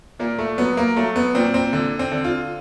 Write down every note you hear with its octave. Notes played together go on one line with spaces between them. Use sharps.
A#2 A#3
A3
F#3 B3
A#3
F#3 A3
B3
A#2 C4
C4
D3
C4
D3
F4